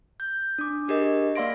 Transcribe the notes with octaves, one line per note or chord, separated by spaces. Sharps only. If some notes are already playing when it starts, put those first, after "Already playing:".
G6
D4 D6
D4 G4 G#4 A#4 D#5
A#3 D5 F5 C6 A#6 D7